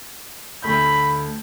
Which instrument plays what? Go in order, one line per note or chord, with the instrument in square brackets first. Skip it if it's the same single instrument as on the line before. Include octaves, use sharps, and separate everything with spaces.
[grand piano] D2 A3 G6 [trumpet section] B5